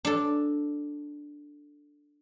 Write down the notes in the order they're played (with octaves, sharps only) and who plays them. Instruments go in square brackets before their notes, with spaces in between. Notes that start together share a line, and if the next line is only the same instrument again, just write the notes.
[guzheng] D4 A4